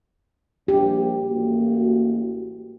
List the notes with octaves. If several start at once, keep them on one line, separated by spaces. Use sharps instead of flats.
A#1 G4
A1 A#3 F#4